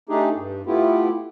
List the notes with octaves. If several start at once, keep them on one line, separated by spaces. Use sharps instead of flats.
A3 D4 D#4 G4 G#4
G2
A3 B3 E4 F4 G4